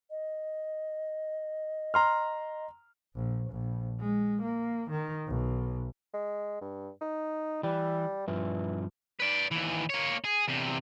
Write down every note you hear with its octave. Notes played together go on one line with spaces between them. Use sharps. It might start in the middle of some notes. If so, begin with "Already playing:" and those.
D#5
A#5 C6 F6
A#1
A#1
G#3
A#3
D#3
B1
G#3
G2
D#4
E3 G3
G2 E3 F3
B4 D5
D#2 E3
A#3 C#5
G#4
E2 C3